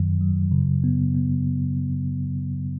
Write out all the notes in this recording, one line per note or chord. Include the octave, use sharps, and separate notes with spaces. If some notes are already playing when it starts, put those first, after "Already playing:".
Already playing: F#2 D#3 F#3
F#3
C#3
B3
B3